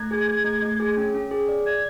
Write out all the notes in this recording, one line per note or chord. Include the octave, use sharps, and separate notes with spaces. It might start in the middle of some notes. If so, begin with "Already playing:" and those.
Already playing: A3 G#6
G#4
G#4
A3
A3
G#4
C#4
C#4
G#4
D5
D5 G#6